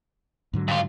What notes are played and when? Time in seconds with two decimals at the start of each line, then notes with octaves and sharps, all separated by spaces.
0.53 G#2 D3 F#3
0.68 G2 F4